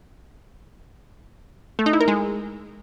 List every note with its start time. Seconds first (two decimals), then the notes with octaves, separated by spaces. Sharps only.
1.79 A3
1.86 D#4
1.93 E4
2.01 A#4
2.08 G#3